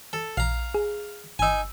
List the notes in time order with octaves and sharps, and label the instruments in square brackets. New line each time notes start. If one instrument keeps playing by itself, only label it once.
[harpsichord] A4
[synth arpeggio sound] A#1 [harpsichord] F5 A#5
[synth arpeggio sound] G#4
[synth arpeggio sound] G1 E6 [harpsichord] D#4 G#5